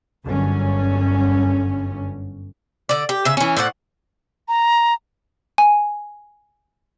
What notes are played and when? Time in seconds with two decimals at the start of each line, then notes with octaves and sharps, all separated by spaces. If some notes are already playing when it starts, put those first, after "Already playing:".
0.25 G1 F#2 D3 C#4
2.89 D3 D5
3.09 G4
3.25 C#3 E5
3.37 E3 C#4
3.57 A2 C5 D5 F#5
4.48 A#5
5.58 G#5